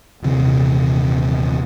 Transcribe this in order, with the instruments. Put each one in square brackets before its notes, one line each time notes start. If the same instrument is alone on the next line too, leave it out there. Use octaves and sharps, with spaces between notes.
[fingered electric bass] D#1 C3 E3